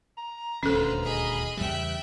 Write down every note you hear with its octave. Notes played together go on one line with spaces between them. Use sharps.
A#5
D#1 D2 D3 C#4 A4 B4 C5
G#4 D#5 B5
E2 C#3 G3 E5 G5 F#6